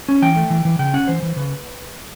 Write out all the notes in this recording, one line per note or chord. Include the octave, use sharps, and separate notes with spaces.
C#4
E3 G5
A3
E3
E3
C#3 G5
C#4 F#5
E3 C5
E3
C#3 B4